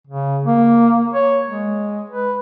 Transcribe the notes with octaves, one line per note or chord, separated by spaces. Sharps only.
C#3
A#3
C#5
G#3
B4